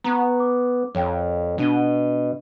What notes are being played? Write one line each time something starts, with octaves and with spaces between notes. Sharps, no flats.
B3 A#5 C#6
D6
F2 C#5 F5 G5
B2 D4 D#7 G7